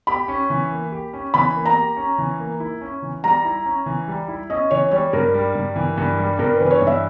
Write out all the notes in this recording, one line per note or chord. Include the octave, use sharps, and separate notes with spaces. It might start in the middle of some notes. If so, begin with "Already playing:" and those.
G4 B5
C#4
E3
A#3
G4
C#4
E3 B5
A#3
A#5
G4
C#4
E3
A#3
E4
C#4
E3
G3 A#5
E4
C#4
E3
G3
E4
C#4 D#5
E3 C#5
G3 C#5
G2 A#4
G3
G2
E3
G2
G3
G2 A#4
B4
E3
B4
C#5
G2
E5